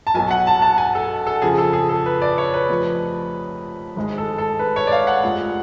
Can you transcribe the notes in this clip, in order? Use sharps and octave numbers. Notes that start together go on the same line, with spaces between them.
A5
B1 B2 F#3 G#5
F#5
A5
A5
G#5
A4
A4
F2 C#3 F3 G#4
A4
G#4
A4
B4
D5
C#5
B4
F1 F2 F3
G#1 G#2 G#3
A4
A4
B4
C#5
D5
F5
F#5
F1 F2 F3 G#3